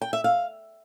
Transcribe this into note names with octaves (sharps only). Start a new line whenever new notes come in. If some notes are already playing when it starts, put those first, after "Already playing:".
G5
E5
F5